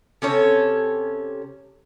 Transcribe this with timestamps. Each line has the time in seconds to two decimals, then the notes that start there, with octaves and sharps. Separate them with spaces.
0.22 C3 C#4 A4 C#5